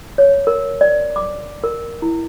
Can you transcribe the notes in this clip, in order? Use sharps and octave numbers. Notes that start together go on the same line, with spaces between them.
C#5
A#4
D5
D6
A#4
E4